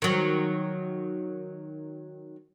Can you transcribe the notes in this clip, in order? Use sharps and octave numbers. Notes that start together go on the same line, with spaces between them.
D#3 F#3